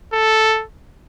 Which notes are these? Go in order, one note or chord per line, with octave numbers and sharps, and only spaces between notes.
A4